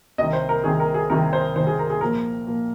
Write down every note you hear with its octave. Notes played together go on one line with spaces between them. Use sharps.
C2 C3 D#3 D#5
C5
A#4
C2 C3 D#3 G#4
A#4
G#4
C2 C3 D#3 A#4
C5
C2 C3 D#3 C5
G#4
A#4
G#4
A#2 F3 A#3 A#4
A#2 F3 A#3